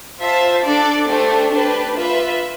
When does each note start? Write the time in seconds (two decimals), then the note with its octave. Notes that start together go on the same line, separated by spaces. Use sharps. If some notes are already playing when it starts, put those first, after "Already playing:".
0.20 F4 C5 E5 A5
0.64 D4 A4 D5
1.09 A3 D4 G4 C5
1.52 D4 G4 B4
1.97 F4 B4 E5